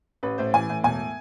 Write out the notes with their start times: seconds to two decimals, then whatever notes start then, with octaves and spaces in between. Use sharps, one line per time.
0.23 A1 B4
0.38 A2 C5
0.54 E3 G#5
0.70 A2
0.84 E1 G#5